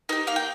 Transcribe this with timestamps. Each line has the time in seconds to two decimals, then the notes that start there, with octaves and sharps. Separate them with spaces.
0.09 D#4 A#4
0.12 G4
0.27 A#3 F5
0.36 G5